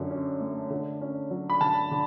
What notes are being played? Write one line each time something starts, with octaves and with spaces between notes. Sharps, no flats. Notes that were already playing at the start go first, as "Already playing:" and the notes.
Already playing: F#2 D3
C#4
A3
D3
C#4
F#3
B5
D3 A5
D3